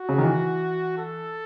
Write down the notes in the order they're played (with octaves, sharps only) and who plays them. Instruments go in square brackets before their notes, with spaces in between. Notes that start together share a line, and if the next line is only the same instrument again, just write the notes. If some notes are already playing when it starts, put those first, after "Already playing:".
Already playing: [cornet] F#4
[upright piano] C#3
D#3
E3
[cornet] A4